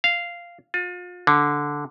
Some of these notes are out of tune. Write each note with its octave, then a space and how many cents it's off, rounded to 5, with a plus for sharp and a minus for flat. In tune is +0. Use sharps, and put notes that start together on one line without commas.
F5 -10
F4 +35
D3 -5